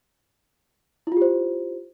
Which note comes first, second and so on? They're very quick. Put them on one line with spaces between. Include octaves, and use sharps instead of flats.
E4 F4 G4 C5